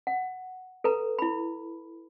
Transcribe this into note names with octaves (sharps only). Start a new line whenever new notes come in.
F#5
A4 B4 A#5
E4 B5